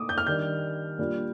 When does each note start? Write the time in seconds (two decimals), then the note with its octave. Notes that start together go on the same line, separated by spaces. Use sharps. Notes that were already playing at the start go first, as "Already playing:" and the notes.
Already playing: A#2 A3 D#4 D6 D#6
0.09 G6
0.18 F6
0.26 D#3 G3 D4 G6
0.98 A#2 G3 D4 F4